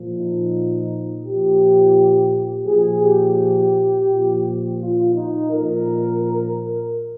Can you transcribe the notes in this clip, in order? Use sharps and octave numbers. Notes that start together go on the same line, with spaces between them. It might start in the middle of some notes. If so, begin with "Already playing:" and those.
Already playing: A#2 F3
D#4
A#2 F3 G4
A#2 F3 G#4
G4
A#2 F3
F4
D#4
A#2 F3 A#4